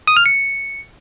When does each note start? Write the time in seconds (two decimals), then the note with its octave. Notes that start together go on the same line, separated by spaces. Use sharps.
0.07 D#6
0.17 F6
0.26 C#7